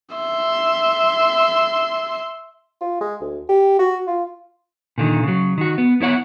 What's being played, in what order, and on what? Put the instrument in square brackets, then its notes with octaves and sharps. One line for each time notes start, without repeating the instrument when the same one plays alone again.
[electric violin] E5 C6
[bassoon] F4
G#3
D2
G4
F#4
F4
[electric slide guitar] A#2 D3 D#3
C#3 F#3
D#3 F#4
B3
B3 E4 C#5 F#5